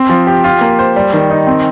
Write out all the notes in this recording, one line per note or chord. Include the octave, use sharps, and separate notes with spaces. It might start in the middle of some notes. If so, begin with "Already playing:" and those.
Already playing: C4
F3
G4
F4
A#3
C5
G3
D#3
D#4
C4